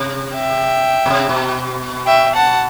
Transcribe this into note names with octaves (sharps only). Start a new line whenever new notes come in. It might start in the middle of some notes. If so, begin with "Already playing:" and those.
Already playing: C3
E5 G5
B2
C3
B2
E5 G5
F#5 A5